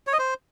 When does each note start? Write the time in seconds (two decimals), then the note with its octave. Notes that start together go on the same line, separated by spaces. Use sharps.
0.07 C#5
0.13 D#5
0.19 C5